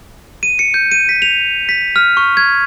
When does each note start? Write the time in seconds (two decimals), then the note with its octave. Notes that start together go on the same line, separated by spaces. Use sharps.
0.43 D#7
0.59 C#7
0.74 G6
0.92 D#7
1.09 B6
1.22 F7
1.69 B6
1.96 F6
2.17 C#6
2.37 G#6